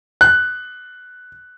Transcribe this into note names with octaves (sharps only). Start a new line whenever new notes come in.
F#6